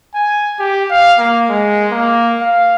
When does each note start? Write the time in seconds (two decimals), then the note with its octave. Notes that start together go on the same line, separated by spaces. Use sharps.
0.15 G#5
0.59 G4
0.90 F5
1.19 A#3
1.49 G#3
1.92 A#3
2.42 F5